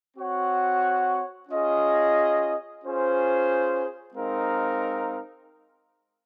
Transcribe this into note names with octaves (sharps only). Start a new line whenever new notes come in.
C4 F#4 C#5 F#5
C#4 F4 G#4 D#5
C#4 F4 G#4 C5
G#3 C4 D#4 A#4 F5